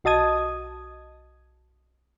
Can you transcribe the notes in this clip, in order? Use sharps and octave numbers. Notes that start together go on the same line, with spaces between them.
B1 F#4 D#5 A5 D#6 G#6